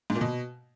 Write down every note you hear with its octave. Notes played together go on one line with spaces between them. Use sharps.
G#2
A#2
B2